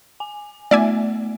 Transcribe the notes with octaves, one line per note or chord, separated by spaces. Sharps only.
G#5
A3 B3 D5 E5 G#5